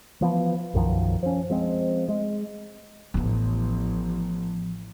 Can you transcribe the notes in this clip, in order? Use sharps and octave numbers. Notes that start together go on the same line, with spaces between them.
E3 F3 B3
B1 F#2 D#3 F3
F3 C#4
F3 G#3 C4
G#3
A1 F3 B3